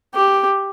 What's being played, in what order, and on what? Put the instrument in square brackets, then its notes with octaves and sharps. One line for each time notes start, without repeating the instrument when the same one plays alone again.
[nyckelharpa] G4